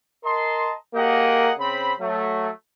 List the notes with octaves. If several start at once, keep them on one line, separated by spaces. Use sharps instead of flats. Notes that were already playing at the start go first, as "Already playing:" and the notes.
A#4 D#5 A5 A#5 C6
A#3 G4 G#4 A#4 D#5 F#5
C#3 C4 C5 B5
F#3 A3